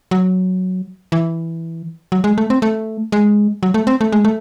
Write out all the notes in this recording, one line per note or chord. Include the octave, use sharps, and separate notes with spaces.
F#3
E3
F#3
G#3
A3
C4
A3
G#3
F#3
A3
C4
A3
G#3
A3